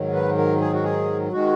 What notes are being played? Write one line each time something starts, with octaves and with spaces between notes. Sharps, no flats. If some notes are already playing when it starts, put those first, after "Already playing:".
Already playing: G#2 D#3 F#3
B4
A#4
G#4
F#4
G#4
D#3 G#3 F#4